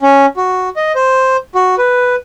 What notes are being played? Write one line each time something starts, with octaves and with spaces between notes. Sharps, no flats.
C#4
F#4
D#5
C5
F#4
B4